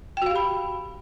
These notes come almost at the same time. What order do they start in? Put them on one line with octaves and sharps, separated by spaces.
G5 F#4 F5 G4 B5